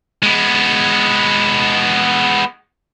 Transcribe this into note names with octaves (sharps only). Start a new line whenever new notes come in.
G#3 B3